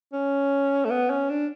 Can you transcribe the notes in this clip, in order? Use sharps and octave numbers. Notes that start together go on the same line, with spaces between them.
C#4
A3
B3
C#4
D4